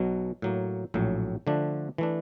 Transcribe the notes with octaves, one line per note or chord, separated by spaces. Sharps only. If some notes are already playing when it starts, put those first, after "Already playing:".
Already playing: B1 B2 F#3
A2 F#3 A#3
A#1 A2 F#3
D3 F3 A3 D4
E3 A3 D4